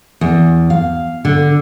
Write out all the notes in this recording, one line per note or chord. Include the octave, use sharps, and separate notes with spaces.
E2
F5
D3